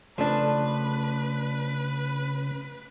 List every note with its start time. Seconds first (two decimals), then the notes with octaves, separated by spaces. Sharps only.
0.18 C#3 F3 A3 D4 B4